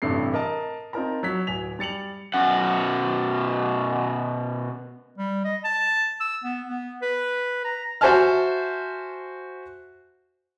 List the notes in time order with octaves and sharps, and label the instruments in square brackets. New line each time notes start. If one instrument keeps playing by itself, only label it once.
[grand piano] A1 G2 C3 A3 C7
A#4 D#5 A5
C4 D#4 F4 A#4 A5 A#5
F#3 B6
D1 G#5 B6 F7
G3 A6 C#7 F7 F#7
[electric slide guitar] B2 C#4 F#5
[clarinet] G3
D#5
A5
E6
B3
B3
B4
A#5
[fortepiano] F#4 C5 E5 G#5 A5 F6